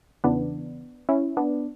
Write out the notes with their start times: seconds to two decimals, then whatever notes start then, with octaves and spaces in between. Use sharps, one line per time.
0.24 E2 C#3 E3 B3 D4
1.09 C#4 E4
1.37 B3 D4